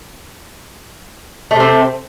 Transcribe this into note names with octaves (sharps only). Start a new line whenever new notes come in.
C3 A3 C4